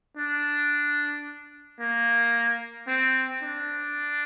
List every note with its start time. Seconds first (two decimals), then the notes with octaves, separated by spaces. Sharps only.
0.17 D4
1.80 A#3
2.88 C4
3.43 D4